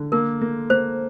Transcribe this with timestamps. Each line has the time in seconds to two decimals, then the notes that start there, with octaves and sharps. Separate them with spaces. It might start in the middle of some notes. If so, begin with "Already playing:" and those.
Already playing: D3
0.12 A#3 A#4
0.41 A#3
0.70 A#3 C5